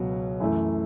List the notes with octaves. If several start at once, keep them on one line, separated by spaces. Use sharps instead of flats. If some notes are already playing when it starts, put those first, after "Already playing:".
Already playing: C#2 B2 F#3
F#2 E3 A3